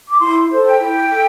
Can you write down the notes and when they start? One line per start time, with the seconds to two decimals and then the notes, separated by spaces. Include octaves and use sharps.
0.07 D6
0.20 E4 C6
0.49 A4 C5
0.65 G5
0.80 E4
1.11 A4